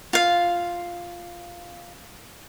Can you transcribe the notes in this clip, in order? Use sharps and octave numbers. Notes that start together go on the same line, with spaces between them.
F4 F5